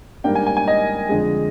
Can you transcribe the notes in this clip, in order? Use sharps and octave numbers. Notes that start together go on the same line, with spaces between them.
G#2 G3 A#3 D4 G5
G#5
G#5
G#5
D#5
F2 D3 G#3